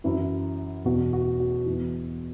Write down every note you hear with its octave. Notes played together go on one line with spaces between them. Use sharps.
F#2 E3 E4
E2 B2 F#4
F#4
F#4
E2 E3